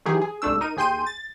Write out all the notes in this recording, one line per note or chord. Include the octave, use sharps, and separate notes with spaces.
D#3 E3 F#3 G4 G#4
G#4
C2 G#2 A3 D4 E6
D#4 A#4 D#7
D#2 G#4 G5 C6 G6 D#7
A6